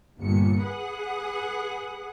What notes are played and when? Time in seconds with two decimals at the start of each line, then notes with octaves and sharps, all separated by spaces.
0.19 G1 A#2 C#7
0.63 G#4 B4 F#5